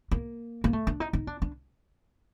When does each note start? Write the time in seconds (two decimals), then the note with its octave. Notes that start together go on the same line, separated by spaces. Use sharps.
0.12 A#3
0.64 A#3
0.73 A3
0.87 D4
1.00 D#4
1.13 D#4
1.27 D4
1.42 D4